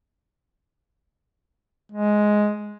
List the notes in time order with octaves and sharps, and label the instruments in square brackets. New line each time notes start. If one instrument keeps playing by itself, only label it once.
[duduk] G#3